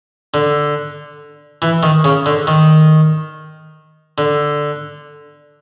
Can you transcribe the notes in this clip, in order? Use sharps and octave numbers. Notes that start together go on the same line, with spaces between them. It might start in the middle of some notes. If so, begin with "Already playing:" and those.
D3
E3
D#3
C#3
D3
D#3
D3